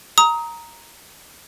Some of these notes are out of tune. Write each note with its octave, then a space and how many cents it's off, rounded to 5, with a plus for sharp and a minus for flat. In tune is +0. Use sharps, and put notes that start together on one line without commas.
A#5 +0 D#6 +25